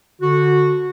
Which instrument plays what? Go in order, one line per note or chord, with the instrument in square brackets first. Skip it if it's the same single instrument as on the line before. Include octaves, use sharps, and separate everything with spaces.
[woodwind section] D3 F#4